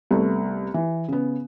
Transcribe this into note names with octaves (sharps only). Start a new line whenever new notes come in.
C2 A3 B3
E3
C#3 B3